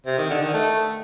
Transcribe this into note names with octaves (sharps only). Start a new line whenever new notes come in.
C3
D#3
D3
D#3
A3